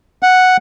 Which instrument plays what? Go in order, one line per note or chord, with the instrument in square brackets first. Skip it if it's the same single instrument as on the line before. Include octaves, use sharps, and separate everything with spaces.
[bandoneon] F#5